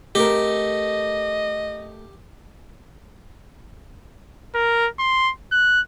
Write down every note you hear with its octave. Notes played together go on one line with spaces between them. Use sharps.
A3 C4 G4 A#4 D#5
A#4
C6
F#6